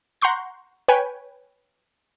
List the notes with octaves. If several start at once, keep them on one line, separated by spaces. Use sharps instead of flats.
F#5 A#5 C6 C#6 G6
B4 C#5 G5 G#5